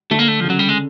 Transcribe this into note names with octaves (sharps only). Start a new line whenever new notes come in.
D3 A3
A#3
A3
C#3 F3
F#3
G3
G#3